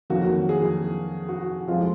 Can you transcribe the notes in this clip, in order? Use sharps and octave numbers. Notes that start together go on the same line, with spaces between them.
F2 D#3 F#3 A#3 F#4
G#4
F#4
F2 F3 G#3 F4